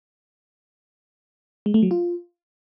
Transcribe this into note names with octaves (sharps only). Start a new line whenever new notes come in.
G#3
A3
F#3
F4